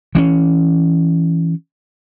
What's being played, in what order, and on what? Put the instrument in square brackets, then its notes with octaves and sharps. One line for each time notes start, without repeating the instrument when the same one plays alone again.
[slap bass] E3 C4 C#4